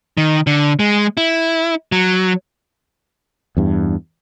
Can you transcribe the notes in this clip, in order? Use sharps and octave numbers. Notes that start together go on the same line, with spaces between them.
D#3
D3
G#3
E4
F#3
E2 G2